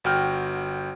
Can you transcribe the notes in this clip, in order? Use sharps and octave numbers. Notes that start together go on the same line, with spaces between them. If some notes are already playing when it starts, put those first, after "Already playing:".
G1 F#4 G5 F6